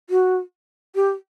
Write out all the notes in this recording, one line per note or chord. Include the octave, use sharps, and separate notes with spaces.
F#4
G4